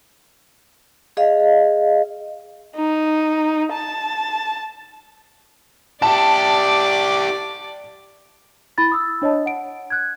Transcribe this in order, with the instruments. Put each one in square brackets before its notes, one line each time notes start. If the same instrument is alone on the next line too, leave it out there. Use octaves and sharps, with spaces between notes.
[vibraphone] G#4 D#5 F5
[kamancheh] D#4
A5
[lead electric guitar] E4 G4 [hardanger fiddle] D5 D6 [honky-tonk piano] A5
[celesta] E4 B5 A6
D#6 E6
D4 C#5 D#5 A5
F#5 D7
F#6 G#6